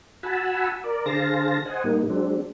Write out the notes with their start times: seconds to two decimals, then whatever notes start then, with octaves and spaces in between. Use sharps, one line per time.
0.23 F#4 F#5 G#5 A5 B5 E6
0.84 A#4 D5
1.06 D3 G#4 C5 F5 A5 A#6
1.65 C5 D#5 F#5 G#5
1.84 A2 G3 A#3 D#4
2.10 F#3 G#3 C4 D4